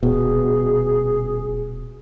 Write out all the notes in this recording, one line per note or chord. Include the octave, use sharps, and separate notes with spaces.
D#1 B2 G#4